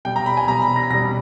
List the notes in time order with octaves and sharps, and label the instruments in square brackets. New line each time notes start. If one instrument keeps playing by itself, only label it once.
[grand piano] B2 G3 G5
A#5
B5
G#5
B2 G3 A#5
B5
A#6
B2 G3 A#6